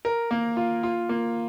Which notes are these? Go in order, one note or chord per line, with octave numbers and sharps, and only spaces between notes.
A#4
A#3
F4
F4
A#3